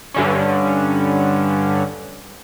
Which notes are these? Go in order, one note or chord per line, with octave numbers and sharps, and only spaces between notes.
G2 D3 C#4